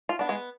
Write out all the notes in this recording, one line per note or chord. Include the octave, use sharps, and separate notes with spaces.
F4
B3 D4
G#3 G#4